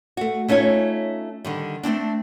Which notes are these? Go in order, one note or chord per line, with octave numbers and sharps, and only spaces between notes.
A3 F#4
A3 C#4 D#4 F4 C#5
D3 D#3 G3
A3 A#3 C4 D4